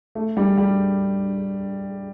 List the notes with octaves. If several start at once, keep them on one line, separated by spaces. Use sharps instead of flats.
A3
G3
G3